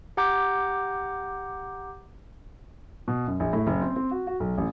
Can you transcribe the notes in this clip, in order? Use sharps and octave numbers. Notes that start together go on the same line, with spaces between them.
G4 F#5 A#5 D6 G6
B2
F#2
A#1
A2
F#1
C4
C4
F#4
F#4
B1
A1